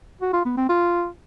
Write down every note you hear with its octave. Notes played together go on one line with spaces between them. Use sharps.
F#4
F4
B3
C4
F4